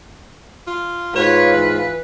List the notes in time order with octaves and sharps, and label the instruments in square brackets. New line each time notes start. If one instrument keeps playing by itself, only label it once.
[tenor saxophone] F4
[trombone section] G#2 F4 [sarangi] B4 [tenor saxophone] C#5
[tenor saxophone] E3